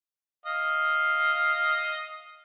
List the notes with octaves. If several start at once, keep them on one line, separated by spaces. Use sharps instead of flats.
D#5 F5